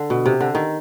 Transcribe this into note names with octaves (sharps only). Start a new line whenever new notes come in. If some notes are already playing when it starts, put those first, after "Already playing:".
Already playing: D3
B2
C3
D3
D#3